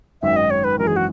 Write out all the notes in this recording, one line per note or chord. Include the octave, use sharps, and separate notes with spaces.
G#1 F#2 D#3 E5
D#5
C#5
B4
G#1 F#2 E3 A#4
G#4
F#4